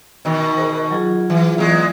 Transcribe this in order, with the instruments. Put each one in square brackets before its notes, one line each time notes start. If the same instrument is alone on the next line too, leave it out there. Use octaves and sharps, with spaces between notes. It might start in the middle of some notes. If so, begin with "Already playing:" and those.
[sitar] B2 D#3
[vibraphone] G#4 A#4 C5
F#3 F4 G#4
[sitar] E3
E2 G#3